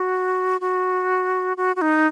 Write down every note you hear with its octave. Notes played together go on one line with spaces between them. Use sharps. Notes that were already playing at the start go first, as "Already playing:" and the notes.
Already playing: F#4
F#4
F#4
F#4
D#4